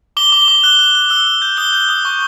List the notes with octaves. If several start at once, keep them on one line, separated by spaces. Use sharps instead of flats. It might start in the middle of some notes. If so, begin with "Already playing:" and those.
D6 G7
D6
G7
D6
F#6 G7
F#6
F#6
E6 G7
E6
G6
D#6 G7
G6
D#6
C#6